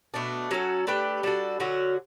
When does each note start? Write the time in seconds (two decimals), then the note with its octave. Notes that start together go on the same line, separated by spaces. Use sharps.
0.14 B2 A3 D4
0.51 F#3 C#4 F#4 A4
0.87 A3 D4 G4 B4
1.23 G3 D4 F#4 A4
1.60 D3 F#3 C#4 F#4